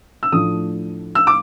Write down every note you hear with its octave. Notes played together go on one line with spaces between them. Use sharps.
E6
A2 F3 A3 D4 D#6
E6
D6